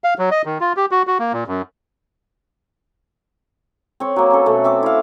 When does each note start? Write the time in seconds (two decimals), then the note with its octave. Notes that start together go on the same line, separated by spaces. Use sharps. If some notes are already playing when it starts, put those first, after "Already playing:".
0.04 F5
0.18 F#3
0.31 D#5
0.45 D#3
0.60 F4
0.77 G4
0.91 F#4
1.07 F#4
1.19 A#3
1.33 A#2
1.47 F#2
4.00 C4 C#5
4.16 F#3 A#3
4.31 C#4 A4
4.46 B2 A3
4.64 C4 E5 D6
4.83 E4 F5